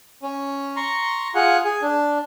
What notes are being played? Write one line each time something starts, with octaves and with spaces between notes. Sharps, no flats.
C#4
A#5 C6 C#6
F4 G#4 F#5
G#4
D4